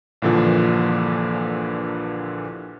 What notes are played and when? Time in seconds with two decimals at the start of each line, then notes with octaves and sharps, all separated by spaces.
0.22 A#1 G2 A#2 D3 E3 F3